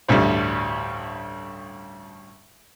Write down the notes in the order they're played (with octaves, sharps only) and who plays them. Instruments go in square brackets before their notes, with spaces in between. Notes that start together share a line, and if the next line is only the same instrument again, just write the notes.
[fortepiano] A1 D2 G2 G3